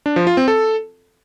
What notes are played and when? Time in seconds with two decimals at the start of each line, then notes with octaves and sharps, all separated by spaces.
0.06 D4
0.16 F3
0.27 F4
0.37 C4
0.48 A4